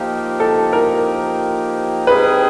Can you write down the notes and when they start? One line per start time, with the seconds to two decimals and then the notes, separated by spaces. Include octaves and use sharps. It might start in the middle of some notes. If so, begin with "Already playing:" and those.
Already playing: F3 A#3 D#4 G4
0.40 A4
0.73 A#4
2.07 G3 C4 D#4 G#4 B4